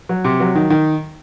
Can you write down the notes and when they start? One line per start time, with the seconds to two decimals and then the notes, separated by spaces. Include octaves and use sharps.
0.09 F#3
0.24 C3
0.40 F#3
0.55 D#3
0.70 D#3